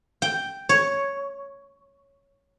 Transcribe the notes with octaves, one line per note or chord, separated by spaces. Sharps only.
G5
C#5